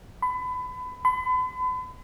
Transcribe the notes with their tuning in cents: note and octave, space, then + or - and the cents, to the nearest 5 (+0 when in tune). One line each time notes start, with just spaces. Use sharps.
B5 +30
B5 +40